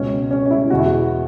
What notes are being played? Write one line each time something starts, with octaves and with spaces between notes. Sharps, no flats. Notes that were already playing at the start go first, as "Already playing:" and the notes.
Already playing: C#2 B2 C#4
C#4
C#4
E4
E2 B2 F#4
E4
F#4